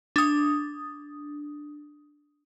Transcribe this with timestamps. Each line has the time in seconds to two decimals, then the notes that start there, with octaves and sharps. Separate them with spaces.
0.16 D4 D#6